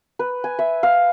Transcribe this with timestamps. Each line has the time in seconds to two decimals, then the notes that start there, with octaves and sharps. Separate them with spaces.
0.19 B4
0.44 G#5
0.59 E5
0.83 F5